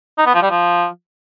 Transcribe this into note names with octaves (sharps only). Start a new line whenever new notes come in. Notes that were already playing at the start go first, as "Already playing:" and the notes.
D#4
B3
F3
G3
F3